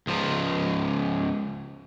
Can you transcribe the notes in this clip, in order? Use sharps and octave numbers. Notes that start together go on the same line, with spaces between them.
C#2 F3